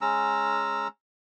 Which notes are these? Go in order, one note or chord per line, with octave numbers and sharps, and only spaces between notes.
G#3 C#4 A#5 E6